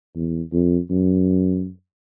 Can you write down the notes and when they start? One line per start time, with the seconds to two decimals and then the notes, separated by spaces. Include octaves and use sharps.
0.16 E2
0.53 F2
0.90 F#2